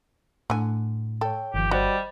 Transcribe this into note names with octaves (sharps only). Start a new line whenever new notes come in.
A2 D3 G#5
A4 C#5 G5
G1 D#3 F3 G4
G3 F#4 C5 D#5